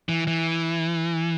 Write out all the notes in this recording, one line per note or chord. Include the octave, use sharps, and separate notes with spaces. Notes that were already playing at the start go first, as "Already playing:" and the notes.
E3
E3